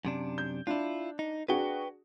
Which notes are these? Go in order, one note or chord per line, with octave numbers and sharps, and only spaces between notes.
F#2 C3 D4
G6
D4 E4 F4
D#4
D4 F#4 G#4 B4 G5